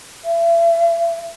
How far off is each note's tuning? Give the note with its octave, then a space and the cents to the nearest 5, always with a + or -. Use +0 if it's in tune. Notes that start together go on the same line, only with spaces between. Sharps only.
E5 +40